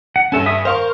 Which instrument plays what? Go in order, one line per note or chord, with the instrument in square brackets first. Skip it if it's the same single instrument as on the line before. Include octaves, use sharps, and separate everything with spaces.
[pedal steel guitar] F#5
[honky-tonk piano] G2 G#5 [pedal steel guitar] C#4 A4
[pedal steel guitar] E5 D#6
[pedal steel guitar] A#4 [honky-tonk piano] C5 F5 C#6